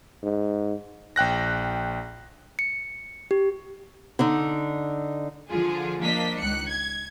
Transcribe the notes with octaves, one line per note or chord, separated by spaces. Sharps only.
G#2
A#1 G5 F#6 A#6
C#7
G4
D3 D4 D#4
D3 F3 F4 G#4
F3 A#3 D4 D#5 B6
C#2 D#3 F#6 C#7
G#6